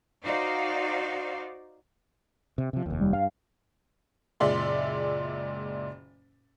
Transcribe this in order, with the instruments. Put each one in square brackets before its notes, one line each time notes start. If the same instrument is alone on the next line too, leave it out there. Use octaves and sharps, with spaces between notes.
[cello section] D#4 F#4 C5 D5 F5
[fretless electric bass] C3
C3 F3
F1 D#2
[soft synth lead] G3
[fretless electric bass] G2 [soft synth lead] F5
[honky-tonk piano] F#1 A#2 G#3 D5 E5 C6